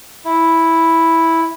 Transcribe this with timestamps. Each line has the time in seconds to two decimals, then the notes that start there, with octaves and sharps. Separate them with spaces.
0.25 E4